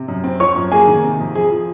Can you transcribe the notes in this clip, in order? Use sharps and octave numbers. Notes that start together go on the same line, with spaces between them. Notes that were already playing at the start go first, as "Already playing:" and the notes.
Already playing: C3
F#2
C4
F3 C#5 C#6
F#2
A#3 G#4 G#5
D#3
C3
F2
F2 G#4 G#5
F3